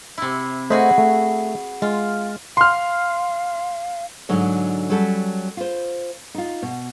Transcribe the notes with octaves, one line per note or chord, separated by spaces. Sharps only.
C3 E4
A3 F#4 G#4 B4 C5 D#5
A3
G#3 F4
F5 C6 F6
G#2 D3 F#3 D#5
F#3 G3 C#4 A4
F4 C5
D#4 F4
B2